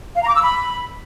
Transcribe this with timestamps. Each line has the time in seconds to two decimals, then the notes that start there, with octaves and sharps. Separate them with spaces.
0.15 F5
0.22 A#5
0.28 D6
0.35 E6
0.41 B5